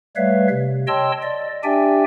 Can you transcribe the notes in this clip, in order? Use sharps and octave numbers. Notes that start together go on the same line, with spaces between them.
G3 A3 B4 C#5 E5 F5
C3
C#5 D#5 G5 A5 C6 E6
D5 D#5
D4 G4 D5 E5 G5 G#5